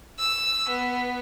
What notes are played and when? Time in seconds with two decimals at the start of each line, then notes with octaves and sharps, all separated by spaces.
0.19 E6
0.69 B3